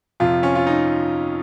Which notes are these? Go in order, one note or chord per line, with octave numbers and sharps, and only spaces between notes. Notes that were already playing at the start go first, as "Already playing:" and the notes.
F2 C3 F3 F4
C#4
F4
D#4